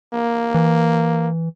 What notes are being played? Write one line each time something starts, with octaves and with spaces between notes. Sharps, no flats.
A#3
E3